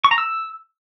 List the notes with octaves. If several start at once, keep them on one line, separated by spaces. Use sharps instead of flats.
C#6
A#5
E6